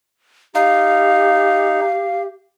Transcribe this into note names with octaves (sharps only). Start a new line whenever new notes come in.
D#4 G4 F5